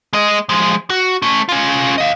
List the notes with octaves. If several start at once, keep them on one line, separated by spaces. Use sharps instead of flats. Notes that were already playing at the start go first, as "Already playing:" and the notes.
G#3 D#5
F3 G#3
F#4
A3 C#4
C#4 F4
D#5 F5